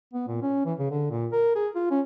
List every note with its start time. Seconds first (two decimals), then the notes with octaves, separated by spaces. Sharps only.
0.13 B3
0.28 A#2
0.42 C#4
0.65 E3
0.79 C#3
0.90 D3
1.11 A#2
1.33 A#4
1.55 G#4
1.76 F4
1.91 C#4